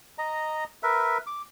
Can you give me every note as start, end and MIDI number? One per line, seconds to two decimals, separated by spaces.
0.18 0.64 75
0.18 0.64 82
0.83 1.18 70
0.83 1.18 71
0.83 1.18 76
1.27 1.42 86